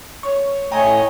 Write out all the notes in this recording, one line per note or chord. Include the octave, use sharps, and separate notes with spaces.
C#5 C#6
A2 A3 C#5 D#5 G5 G#5 A#5